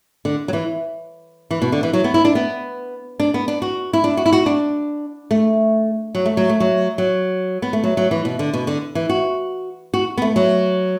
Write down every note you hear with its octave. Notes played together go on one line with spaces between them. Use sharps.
D3
F#3
E3
E3
B2
D3
E3
F#3
B3
E4
D4
B3
D4
B3
D4
F#4
E4
D4
F#4
E4
F#4
D4
A3
F#3
A3
F#3
A3
F#3
F#3
B3
A3
F#3
F#3
E3
B2
D3
B2
D3
E3
F#4
F#4
B3
A3
F#3